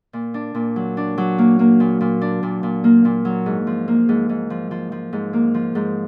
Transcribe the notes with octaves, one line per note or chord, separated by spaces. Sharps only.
A#2
D4
A#2
F#3
D4
F#3
A#3
A#3
A#2
A#2
D4
A#2
A#2
A#3
A#2
F#3
G#2
F3
A#3
G#2
G#2
F3
F3
F3
G#2
A#3
F3
G#2